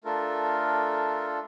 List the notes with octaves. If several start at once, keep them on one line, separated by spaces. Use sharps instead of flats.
A3 D4 F4 A4 A#4